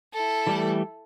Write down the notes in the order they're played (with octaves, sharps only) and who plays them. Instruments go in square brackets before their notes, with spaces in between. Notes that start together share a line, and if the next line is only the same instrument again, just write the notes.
[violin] E4 A4
[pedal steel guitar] E3 G3 A3